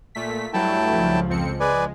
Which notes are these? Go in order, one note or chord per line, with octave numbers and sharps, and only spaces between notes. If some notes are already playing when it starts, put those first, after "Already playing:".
A#2 A3 B6
G2 F#3 A3 E4 G5 A5
C#2 F3
F2 C4 C#7
G#3 B4 D5 G#5